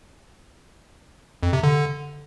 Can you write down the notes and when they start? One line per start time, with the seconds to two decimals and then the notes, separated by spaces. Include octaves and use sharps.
1.43 F2
1.53 C3
1.63 D3